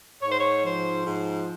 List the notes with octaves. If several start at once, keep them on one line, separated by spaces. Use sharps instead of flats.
G#2 C#5
C5
C#5
F3 C5
G#2